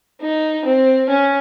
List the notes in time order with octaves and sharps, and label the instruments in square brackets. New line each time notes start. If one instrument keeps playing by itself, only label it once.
[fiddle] D#4
C4
C#4